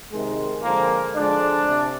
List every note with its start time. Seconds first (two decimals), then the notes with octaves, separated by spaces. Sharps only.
0.10 C3 D#3 G#3
0.63 D3 F3 G#3 A#3
1.15 D3 F3 G#3 D4
1.67 C3